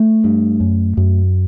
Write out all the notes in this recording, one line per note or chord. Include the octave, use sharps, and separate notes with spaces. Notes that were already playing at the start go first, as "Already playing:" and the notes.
Already playing: A3
G2
F#2
F#2